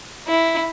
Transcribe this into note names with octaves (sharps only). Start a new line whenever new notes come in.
E4